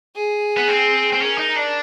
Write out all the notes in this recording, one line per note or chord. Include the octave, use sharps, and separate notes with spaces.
G#4
B3
C4
C4
C#4 A#4
D#4
D4